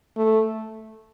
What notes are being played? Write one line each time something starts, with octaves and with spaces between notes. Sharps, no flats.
A3